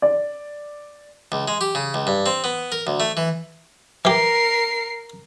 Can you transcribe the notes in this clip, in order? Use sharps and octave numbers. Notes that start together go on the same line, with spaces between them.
D5
C#2
G#3
G4
C#3
C#2
G2
C4
B3
A#4
D2
A3
E3
E3 G4 A#4 C7